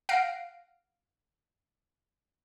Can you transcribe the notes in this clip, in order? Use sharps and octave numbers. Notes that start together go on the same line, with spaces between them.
F5 F#5 A#6 C7 D7